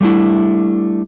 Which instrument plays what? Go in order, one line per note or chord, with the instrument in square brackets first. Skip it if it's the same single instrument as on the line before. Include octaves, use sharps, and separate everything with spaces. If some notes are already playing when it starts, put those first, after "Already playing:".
[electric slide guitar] G3 A3 D4 E4